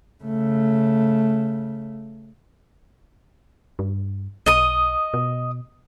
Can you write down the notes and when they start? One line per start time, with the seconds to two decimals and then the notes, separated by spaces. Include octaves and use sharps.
0.24 C#3 A3
3.79 G2
4.46 B1 D#5 D#6
5.14 B2